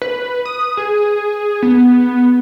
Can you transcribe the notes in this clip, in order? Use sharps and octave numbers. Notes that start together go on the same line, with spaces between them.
B4
D#6
G#4
B3